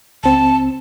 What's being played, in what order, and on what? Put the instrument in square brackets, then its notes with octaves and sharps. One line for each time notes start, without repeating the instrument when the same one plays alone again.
[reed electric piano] C#2 C4 [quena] A5